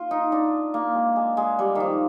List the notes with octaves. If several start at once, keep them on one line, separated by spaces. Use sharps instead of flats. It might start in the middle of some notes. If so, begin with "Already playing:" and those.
Already playing: F4
D#4
D4
A#3
G#3
G#3
G#3
G3
D#3 F3